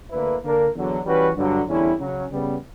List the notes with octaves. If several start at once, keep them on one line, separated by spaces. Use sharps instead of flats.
D2 D3 A#3 E4 B4
D3 A#3 D4 A#4
E2 D3 F#3
E3 G3 C#4 F#4 B4
G2 D3 F#3
E2 D3 G3 C#4 E4
C#3 F#3 C#4
C#3 G3 B3